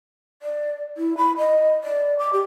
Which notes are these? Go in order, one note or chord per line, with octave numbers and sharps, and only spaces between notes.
D5
E4
B5
D#5
D5
D6
G4